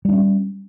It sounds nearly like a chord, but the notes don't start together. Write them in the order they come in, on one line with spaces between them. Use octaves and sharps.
G3 D4 C#4